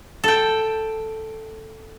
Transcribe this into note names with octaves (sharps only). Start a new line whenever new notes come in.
A4 G5